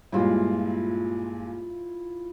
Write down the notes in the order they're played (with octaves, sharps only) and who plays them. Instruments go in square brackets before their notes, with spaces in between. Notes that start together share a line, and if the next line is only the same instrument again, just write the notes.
[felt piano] G2 A#2 G#3 [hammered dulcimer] E4 F4